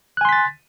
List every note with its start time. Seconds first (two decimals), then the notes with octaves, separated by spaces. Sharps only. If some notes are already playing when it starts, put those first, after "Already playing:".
0.17 F#6
0.21 G#5
0.25 C6
0.29 B6
0.33 A6